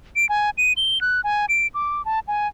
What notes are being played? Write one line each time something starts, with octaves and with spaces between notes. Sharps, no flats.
D7
G#5
D#7
G7
F#6
G#5
D7
D6
A5
G#5